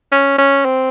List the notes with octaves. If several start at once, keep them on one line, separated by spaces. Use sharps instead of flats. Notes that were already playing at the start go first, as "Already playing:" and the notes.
C#4
C#4
C4